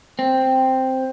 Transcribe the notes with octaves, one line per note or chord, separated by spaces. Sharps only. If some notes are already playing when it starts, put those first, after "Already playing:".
C4